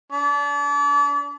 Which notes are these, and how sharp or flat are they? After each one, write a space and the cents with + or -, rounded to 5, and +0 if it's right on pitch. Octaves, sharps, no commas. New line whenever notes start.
D4 -35